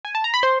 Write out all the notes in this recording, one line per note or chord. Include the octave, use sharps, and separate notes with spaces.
G#5
A5
A#5
B5
C5 C6